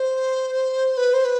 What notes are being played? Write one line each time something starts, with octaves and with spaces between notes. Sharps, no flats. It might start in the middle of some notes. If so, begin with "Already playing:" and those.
Already playing: C5
B4
C5
B4